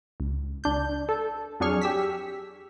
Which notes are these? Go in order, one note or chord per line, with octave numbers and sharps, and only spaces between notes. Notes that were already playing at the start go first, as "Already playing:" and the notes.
C#2
C#2 D4 G6
A4
F2 F#3 D4 G#4 C#6 F6
G4 E6 B6